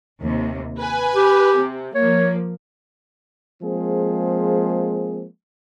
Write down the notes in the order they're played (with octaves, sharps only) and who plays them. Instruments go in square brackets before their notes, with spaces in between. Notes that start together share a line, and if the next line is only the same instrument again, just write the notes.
[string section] D#2 C3
B4 G#5
[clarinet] G4
[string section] C3
[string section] F3 A#3 [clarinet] C#5
[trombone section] F3 G#3 A#3 C4 G#4